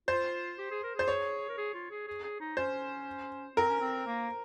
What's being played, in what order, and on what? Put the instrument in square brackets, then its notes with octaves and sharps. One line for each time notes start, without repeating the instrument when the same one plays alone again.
[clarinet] F4 [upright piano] C5
[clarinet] G4
G#4
A#4
[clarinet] G#4 [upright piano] C5
[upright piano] C#5
[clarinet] A#4
G#4
F4
G#4
G#4
G#4
D#4
[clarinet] C#4 [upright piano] C5
[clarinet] C4 [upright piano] A#4
[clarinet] C#4
C4
A#3